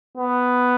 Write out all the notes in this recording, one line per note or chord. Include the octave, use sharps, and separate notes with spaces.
B3